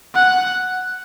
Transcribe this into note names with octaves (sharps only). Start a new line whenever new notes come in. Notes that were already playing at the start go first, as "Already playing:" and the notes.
F#5